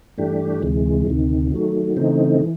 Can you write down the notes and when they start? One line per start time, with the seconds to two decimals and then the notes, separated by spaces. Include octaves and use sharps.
0.18 G2 E3 A3 D4 G4
0.62 D2 C3 E3 G#3
1.07 D2 C3 D#3
1.52 D#3 F#3 A3
1.97 C#3 E3 A3 C4 D#4
2.41 E3